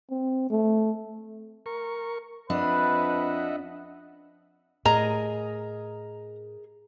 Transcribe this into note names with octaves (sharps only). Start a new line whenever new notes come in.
C4
A3
A#4 C#6
F2 D4 B4 D#5 E5 F#5
A2 G#4 A#4 D#5 A#5